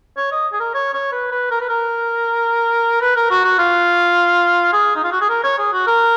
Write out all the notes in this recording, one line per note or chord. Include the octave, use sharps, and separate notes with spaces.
C#5
D#5
G#4
A#4
C#5
C#5
B4
B4
A#4
B4
A#4
B4
A#4
F#4
F#4
F4
G#4
D#4
F4
F#4
G#4
A#4
C#5
G#4
F#4
A#4